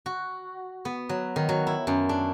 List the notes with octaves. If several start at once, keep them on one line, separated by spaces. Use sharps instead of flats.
F#4
B3
F#3
D#3
F#3
E4
F#2
D4